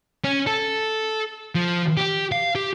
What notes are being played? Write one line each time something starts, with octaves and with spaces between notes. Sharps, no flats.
C#4
A4
F3
G4
F5
G4